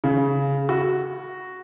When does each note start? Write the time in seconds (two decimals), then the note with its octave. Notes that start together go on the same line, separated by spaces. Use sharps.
0.04 C#3
0.69 F#4